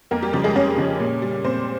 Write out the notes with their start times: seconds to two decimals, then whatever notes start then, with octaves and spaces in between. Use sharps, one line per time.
0.11 F2 A#3 A#4
0.22 G3 G4
0.33 C#3 F3 G3 G4
0.44 G#3 G#4
0.55 F2 C#4 C#5
0.77 C#3 F3
1.00 A#2
1.22 G3
1.44 A#2 C4 C5